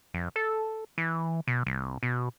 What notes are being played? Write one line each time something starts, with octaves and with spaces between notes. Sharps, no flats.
F2
A4
E3
B2
C2
B2